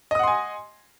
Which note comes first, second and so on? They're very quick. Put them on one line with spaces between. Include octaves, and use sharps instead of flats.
D#5 D#6 F#5 C6 G#5